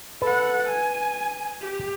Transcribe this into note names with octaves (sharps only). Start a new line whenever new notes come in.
A4 B4 F#5
G#5
G4